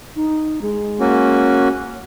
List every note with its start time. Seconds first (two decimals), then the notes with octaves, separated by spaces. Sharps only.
0.16 D#4
0.62 G#3
1.00 A#3 C#4 F#4